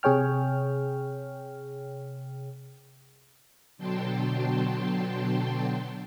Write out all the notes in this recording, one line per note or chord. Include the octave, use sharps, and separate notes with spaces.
C3 G#4 C#5 G5 F6
B2 D3 F#3 G5 A5 C6